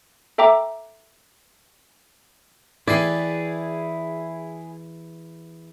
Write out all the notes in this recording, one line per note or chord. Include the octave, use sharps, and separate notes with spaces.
A4 E5 G5 A#5 D6
E2 E4 G#4 B4 D5 G5